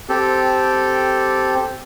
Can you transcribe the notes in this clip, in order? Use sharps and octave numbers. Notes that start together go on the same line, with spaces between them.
C4 G4 A4